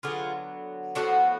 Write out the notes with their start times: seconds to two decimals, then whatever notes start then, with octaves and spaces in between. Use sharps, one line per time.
0.03 D3 F#3 B3 F4 G#4
0.95 A2 F3 B3 D4 F#4